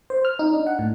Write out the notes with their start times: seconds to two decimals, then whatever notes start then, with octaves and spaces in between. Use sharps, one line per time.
0.10 C5
0.25 F6
0.39 D#4
0.53 D4
0.67 F#5
0.79 A2